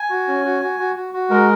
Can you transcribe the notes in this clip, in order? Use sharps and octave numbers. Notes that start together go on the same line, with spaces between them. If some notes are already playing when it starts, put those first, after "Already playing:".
Already playing: G#5
F#4
C#4
F#4
F#4
F#4
F#4
F#4
G#3 A#4